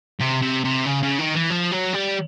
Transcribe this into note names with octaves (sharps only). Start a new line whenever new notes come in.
C3
C3
C3
C#3
C#3
D#3
E3
F3
F#3
G3